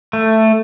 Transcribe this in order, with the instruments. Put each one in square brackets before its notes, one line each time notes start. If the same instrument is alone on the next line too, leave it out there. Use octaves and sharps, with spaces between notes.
[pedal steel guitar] A3